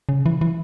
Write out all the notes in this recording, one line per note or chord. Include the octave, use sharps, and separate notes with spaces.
C#3
E3
E3